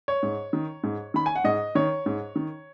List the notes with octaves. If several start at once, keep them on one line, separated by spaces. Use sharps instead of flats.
C#5
G#2
D#3
G#2
D#3 B5
G#5
F#5
G#2 D#5
D#3 C#5
G#2
D#3